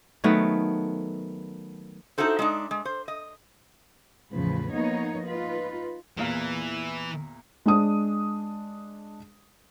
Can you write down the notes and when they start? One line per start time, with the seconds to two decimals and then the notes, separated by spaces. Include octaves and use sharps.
0.24 D#3 F#3 A3 B3
2.18 D#4 E4 F#4 A4 C5
2.39 G#3 D4 D#4
2.71 G#3
2.85 C5
3.08 D#5
4.31 E2 A2 C#3 F3 B4
4.74 F3 A#3 B3 D#4 C#5 D#5
5.27 D#4 F4 B4
6.17 E2 A#2 E3 F5
7.66 G#3 D4 D#6